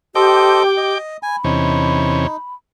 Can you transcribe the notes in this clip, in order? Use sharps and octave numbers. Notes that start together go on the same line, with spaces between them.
G4 A4 C5 D#5 G5 D6
D#5
G#5 B5
E2 C3 C#4 D#4